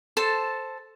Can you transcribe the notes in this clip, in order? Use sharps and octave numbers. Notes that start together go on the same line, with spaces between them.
A4 C5 A5